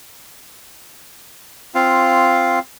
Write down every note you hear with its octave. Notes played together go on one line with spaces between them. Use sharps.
C4 F4 F5